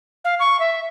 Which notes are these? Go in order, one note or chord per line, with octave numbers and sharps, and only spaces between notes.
F5
C#6
E5